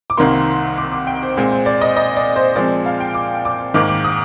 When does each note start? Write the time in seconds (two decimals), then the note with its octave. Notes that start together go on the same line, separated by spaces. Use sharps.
0.10 D6
0.18 C2 C3 D#3 A#3 C6
0.78 D6
0.92 D6
1.07 G5
1.23 C5
1.37 A#2 G#3 C4
1.52 C5
1.66 D5
1.81 D#5
1.97 D#5
2.16 D5
2.36 C5
2.56 A#2 F3 G#3 C4 D5
2.86 F5
3.00 G5
3.15 D6
3.45 D6
3.74 G#2 D#3 A#3 D6
3.89 D6
4.04 D#6